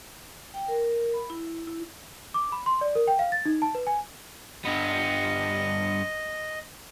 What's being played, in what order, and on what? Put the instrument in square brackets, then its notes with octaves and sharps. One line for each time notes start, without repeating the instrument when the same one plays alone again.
[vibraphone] G5
A#4
B5
E4
E4
[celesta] D6
B5
C6
D5
A#4
G5
F5
A6
D#4
A5
B4
G#5
[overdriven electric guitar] G2 B3 [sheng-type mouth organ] D#5